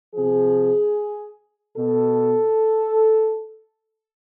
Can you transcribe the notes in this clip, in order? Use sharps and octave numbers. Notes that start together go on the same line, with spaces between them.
C3 F3 G#4
B2 A4